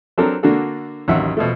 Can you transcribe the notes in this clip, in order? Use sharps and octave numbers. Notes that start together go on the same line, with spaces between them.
F#3 C4 D4 A4 A#4
D3 A#3 D4 F#4 A4
A1 D#2 F#3 E5 F#5
B2 F3 A3